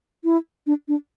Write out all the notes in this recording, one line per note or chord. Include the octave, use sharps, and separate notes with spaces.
E4
D4
D4